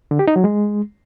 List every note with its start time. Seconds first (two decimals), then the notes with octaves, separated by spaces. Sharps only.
0.11 D3
0.19 G4
0.28 D#4
0.36 F#3
0.44 G#3